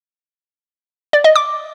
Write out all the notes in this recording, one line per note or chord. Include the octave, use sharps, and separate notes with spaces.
D5
D#5
D6